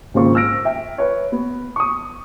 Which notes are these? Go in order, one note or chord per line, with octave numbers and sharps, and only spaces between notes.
G#1 C#3 A#3 C4 F4 C#6
E6 F6 A#6 D7
E5 G5
B4 C#5
B3
C#6 D#6